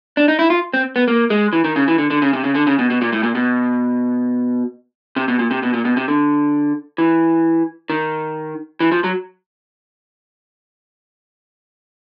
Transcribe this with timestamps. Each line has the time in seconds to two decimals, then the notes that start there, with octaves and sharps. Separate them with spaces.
0.17 D4
0.28 D#4
0.39 E4
0.50 F4
0.74 C4
0.96 B3
1.08 A#3
1.30 G#3
1.53 E3
1.64 D#3
1.76 C#3
1.88 E3
1.98 D3
2.10 D3
2.22 C#3
2.33 C3
2.44 C#3
2.55 D3
2.67 C#3
2.79 B2
2.90 B2
3.02 A#2
3.13 A2
3.23 A#2
3.35 B2
5.16 C3
5.28 B2
5.39 A#2
5.51 C3
5.63 B2
5.74 A#2
5.85 B2
5.97 C3
6.08 D3
6.98 E3
7.90 D#3
8.80 E3
8.92 F3
9.04 F#3